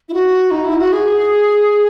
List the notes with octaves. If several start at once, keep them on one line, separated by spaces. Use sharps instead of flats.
E4
F#4
D#4
E4
F#4
G#4